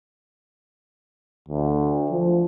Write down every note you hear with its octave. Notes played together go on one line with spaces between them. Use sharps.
D2
F3